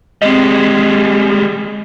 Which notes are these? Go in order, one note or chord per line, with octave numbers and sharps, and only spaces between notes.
G3 G#3 C4 D#5